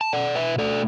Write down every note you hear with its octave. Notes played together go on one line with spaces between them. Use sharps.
A5
B2 D5 F#5
B4 E5
A3 A4 D5